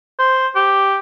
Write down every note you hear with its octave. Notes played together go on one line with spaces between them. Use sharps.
C5
G4